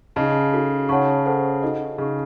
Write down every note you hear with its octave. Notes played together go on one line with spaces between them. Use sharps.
C#3 D#4 G#4 D#5 A5
D#4 F#4 A4
C#3 C#5 F#5 A5 C#6
A4 C5 F#5 A5
D#4 F#4 A4 D#5
C#3 G#4 D#5 A5 C#6